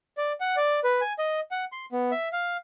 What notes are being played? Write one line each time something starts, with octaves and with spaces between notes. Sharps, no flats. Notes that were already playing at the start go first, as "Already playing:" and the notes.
D5
F#5
D5
B4
G#5
D#5
F#5
C6
B3
E5
F5